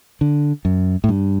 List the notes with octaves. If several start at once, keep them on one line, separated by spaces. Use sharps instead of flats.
D3
F#2
A2
G2